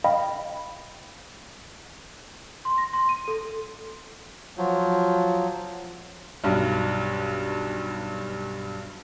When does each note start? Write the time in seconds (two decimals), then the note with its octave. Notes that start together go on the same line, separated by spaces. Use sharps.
0.04 D#5 F5 G5 B5
2.65 C6
2.78 A#6
2.93 C6
3.09 D#7
3.28 A4
4.58 F3 F#3
6.44 B1 G2